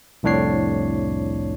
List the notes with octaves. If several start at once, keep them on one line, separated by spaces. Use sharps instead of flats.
C2 F2 A2 D4 C#5 C7